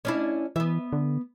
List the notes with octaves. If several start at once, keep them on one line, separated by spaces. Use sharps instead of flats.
C#4 D4 E4
E3 B3 E5
D3